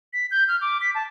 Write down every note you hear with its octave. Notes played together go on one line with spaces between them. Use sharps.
B6
G6
F6
D6
B6
A5